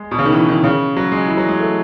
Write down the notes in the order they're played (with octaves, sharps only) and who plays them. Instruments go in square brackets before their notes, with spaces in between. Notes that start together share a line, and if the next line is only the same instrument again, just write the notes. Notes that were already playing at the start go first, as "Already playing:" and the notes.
Already playing: [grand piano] G#3
B2
C#3
D#3
E3
D#3
C#3
F#3
G#3
E3
F#3
G#3
A3